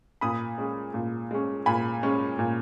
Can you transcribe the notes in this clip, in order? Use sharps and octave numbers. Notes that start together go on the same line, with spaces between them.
A#2 B5 D#6
G#3 C#4
A#2
G#3 C#4
A#2 G#5 B5
G#3 C#4
A#2